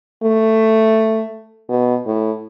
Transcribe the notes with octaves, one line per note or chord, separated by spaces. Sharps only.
A3
B2
A2